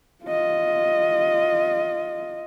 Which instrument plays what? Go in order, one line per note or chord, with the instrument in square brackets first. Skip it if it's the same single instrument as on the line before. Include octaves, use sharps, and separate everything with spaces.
[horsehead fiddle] F4 D#5